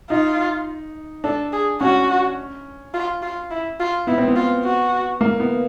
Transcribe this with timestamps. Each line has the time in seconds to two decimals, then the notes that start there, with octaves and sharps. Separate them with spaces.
0.10 D#4 F4
1.24 D4 A4
1.53 G#4
1.81 C#4 F#4
2.94 F4
3.22 F4
3.51 E4
3.80 F4
4.07 B3 E4
4.18 C4
4.28 B3
4.36 F4
4.65 F#4
5.21 A#3
5.40 B3